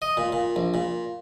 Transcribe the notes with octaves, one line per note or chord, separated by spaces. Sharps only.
D#5
A#2
A#2
A#1
A#2